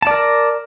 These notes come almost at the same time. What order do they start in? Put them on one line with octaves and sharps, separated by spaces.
A5 D5 A#4